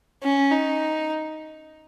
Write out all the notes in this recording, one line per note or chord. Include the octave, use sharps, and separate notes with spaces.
C#4
D#4